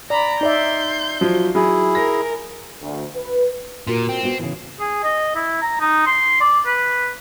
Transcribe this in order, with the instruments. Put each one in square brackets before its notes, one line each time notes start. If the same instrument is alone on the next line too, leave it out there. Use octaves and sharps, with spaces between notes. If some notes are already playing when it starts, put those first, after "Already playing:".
[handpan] D5 [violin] A#5 B5
[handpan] D#4 D5 E5 [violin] C6 G6
[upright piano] F3 F#3
[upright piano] F#3 [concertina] E4 G#4
[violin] A#4 [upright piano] A#6
[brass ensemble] D2
B4
[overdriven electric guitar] A#2 [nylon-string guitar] F4 F#4 A#4
[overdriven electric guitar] C4
[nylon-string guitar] B3 F#4
C#3 E3
[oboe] G#4
D#5
E4
A#5
D#4
C6
D5
B4